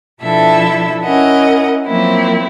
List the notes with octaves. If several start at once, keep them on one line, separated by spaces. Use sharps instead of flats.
B2 F3 D4 E4 A4 E5
C#4 E4 A#4 D#5 F#5
F3 F#3 A#3 C4 E4